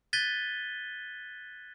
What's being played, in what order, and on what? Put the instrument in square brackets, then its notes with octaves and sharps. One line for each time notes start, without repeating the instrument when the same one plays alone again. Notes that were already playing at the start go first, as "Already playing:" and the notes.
[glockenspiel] F#6 G#6 A6 B6 D#7 G7